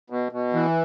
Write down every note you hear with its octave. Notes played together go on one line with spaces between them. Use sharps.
B2
B2
E3